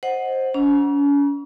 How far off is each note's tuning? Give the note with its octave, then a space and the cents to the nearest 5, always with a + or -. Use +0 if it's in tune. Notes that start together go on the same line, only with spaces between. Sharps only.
C5 +10 D#5 +0 F#5 +0
C#4 +40 A#5 +45